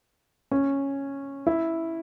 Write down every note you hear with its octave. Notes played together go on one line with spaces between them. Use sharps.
C#4
E4